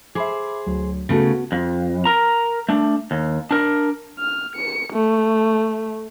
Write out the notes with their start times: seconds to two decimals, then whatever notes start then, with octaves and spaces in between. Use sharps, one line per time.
0.15 G#4 C5 E5 B5 D6
0.66 D2 F#3
1.09 C#3 A3 B3 F#4
1.52 F2
2.05 A#4 A#5
2.69 A3 D4
3.11 D#2
3.51 D4 A#4
4.19 F6
4.55 C#7
4.93 A3